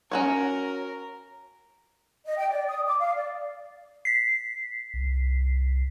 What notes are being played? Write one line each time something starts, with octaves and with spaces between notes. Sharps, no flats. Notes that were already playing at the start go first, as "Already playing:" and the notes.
C#4 F#4 A#4 C#5
D#5
G5
D5
D#6
D6
F5
D5
B6 C7
C2